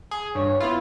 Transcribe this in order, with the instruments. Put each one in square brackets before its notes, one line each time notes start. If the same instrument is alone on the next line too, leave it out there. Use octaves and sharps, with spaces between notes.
[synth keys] G#4
[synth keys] G2 [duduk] C#5
[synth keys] B3 F4 [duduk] E4